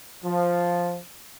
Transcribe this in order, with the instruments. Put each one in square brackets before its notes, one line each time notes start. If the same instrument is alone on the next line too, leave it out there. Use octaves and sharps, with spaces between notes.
[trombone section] F3